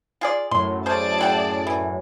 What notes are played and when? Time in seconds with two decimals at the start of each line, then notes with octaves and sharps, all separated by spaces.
0.21 F4 G#4 D5
0.51 F#2 A2 C6
0.86 C#4 G#4 C5 D5 A5
1.19 E4 F#5 G5
1.67 E3